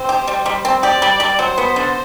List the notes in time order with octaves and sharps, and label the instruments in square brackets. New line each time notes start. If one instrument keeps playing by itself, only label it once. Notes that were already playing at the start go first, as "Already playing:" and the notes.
Already playing: [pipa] C4 [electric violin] C5
[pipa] G4
G3
G3
C4
[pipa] G4 [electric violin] D5
[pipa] G3
G3
[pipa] F#3 [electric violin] C5
[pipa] B3
D3